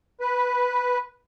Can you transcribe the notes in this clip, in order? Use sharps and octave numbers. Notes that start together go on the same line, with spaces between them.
B4